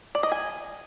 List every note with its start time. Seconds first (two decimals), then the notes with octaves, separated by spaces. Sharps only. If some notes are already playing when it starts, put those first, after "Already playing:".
0.15 D5
0.23 D#5
0.32 G#5